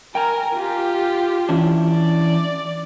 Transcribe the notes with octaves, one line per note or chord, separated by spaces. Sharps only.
A#4 G5 G#5 A#5
F4 G4
E3 C#4 D4
D5